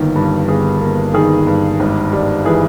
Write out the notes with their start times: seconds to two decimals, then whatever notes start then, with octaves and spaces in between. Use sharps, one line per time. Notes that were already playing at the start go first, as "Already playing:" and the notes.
Already playing: G1 D#3 A#3
0.16 G2
0.48 G1 G#4
0.81 A#3
1.14 D#3 G#4
1.47 G2
1.80 G#1
2.13 G3
2.45 E3 G#4